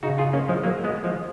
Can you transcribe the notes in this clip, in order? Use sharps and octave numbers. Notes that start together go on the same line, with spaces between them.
C#3 D#4 F#4
F4 G#4
A#3 C#4
F3 G#3
F#3 A#3
G#3 B3
F3 G#3